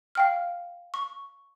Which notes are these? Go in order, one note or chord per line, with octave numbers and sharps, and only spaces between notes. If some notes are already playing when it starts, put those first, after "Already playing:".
F5 G5 F6
C#6